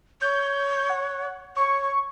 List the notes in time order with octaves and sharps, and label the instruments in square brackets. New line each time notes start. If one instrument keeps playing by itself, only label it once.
[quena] C#5 [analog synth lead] G6
[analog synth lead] F#5
[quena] C#5 [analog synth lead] C#6